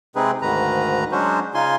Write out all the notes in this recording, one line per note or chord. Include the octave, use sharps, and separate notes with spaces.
C3 G#3 C4 D#4 G#4 B4
D2 G#2 D#3 B4 A#5
F#3 G#3 C#4 D4 F#4 C5
C#3 D#4 F4 G#5 C6